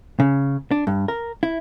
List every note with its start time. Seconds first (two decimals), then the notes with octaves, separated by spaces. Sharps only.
0.20 C#3
0.71 D4
0.87 G2
1.08 A#4
1.43 E4